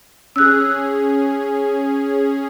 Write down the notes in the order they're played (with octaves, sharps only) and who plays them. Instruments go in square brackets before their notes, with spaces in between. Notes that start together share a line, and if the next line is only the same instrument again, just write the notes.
[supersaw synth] C#4 G#4 [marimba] E6 F#6